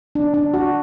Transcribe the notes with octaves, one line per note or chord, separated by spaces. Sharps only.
D4
D4
F#4